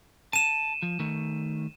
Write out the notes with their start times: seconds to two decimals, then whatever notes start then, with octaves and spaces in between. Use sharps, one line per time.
0.33 A5 D#7 E7
0.82 F3
1.00 D#3 A3